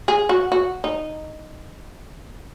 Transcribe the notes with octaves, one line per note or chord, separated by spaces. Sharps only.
G#4
F#4
F#4
D#4